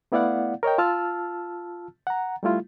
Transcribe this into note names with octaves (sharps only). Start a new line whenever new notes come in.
A3 B3 E4 D5 F5 F#5
A#4 C#5 D#5 G5
F4 A5 E6 F6
F#5 A#5
G3 A3 E4 F4